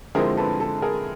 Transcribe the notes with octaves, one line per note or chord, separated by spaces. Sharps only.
D3 F3 G#3 C4 E4 G#4 A#4
A4 B4
A4
G#4 A#4